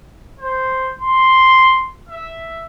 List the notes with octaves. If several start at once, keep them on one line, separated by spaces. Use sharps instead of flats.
C5
C6
E5